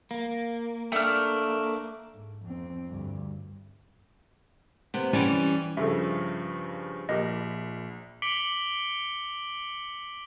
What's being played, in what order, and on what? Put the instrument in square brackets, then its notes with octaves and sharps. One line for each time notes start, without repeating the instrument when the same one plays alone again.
[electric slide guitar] A#3
[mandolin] A3 F6 [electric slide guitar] A#3 D4
[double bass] G#2
F2 C4
D2 G2
[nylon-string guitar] C3 B3
E3 G3 C#4 G4 D5
[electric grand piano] G2 C#3 F3 [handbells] A4 E5
[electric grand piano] A#1 [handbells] G4 A#4 D#5
[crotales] D6 B6 C#7 D7 F#7 G7